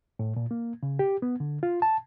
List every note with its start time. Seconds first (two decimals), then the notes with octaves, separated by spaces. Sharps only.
0.19 A2
0.36 A#2
0.51 A#3
0.83 C#3
0.99 G4
1.22 B3
1.40 D3
1.63 F4
1.82 A5